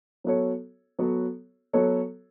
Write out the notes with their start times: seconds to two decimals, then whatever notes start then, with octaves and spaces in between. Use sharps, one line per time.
0.24 F#3 B3 F#4 A4 C#5
0.99 F#3 B3 F#4 A4 C#5
1.73 F#3 B3 F#4 A4 C#5